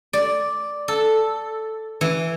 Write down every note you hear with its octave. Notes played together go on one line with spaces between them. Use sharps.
D5
A4
E3